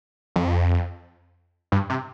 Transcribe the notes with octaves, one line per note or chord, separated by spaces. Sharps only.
F2
G2
C3